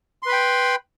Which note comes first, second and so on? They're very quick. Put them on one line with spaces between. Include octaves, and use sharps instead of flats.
C6 B4 B5 G5